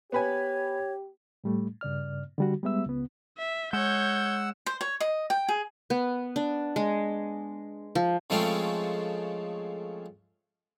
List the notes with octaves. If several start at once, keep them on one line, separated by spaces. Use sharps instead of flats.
B3 G4 B4 C#5 G#5
A2 G3 A3
G2 C#3 D5 F6
D3 G3 F#4
G3 G#3 B3 E5 E6
C#2 B3
E5
G#3 C#5 F#5 E6 G6
C5
C#5
D#5
G5
G#4
B3
D4
G#3
F3
C#3 F3 G#3 A3 C4 C#4